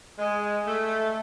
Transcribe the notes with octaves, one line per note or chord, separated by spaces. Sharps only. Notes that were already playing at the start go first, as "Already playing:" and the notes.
G#3
A3